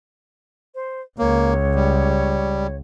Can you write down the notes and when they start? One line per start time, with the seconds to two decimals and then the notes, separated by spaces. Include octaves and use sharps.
0.75 C5
1.19 C#2 A#3 C#5
1.75 G3